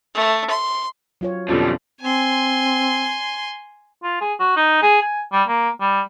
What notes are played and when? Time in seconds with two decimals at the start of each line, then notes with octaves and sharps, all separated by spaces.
0.14 A3
0.49 C6
1.21 F#3 F4 C#5
1.49 F2 B2 D3 F3 G3 C#4 F4
2.01 C4 G#5 C6
4.03 F4
4.21 G#4
4.39 F#4
4.56 D#4
4.82 G#4
5.01 G#5
5.32 G3
5.48 A#3
5.81 G3